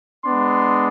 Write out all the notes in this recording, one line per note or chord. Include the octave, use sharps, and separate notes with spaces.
G#3 B3 D4 C6